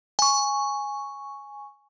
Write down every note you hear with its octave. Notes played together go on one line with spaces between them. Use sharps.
G#5 C#6